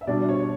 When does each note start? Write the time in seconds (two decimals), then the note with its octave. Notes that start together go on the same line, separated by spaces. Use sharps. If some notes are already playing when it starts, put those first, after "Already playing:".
0.01 E5
0.07 B2 G3 D4 D5
0.29 C#5